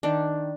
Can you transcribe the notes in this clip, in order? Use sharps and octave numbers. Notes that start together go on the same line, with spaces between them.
D#3 D4